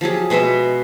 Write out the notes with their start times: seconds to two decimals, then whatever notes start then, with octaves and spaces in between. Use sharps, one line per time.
0.01 F3 F#3 G4 G#4
0.30 B2 G#3 B3 E5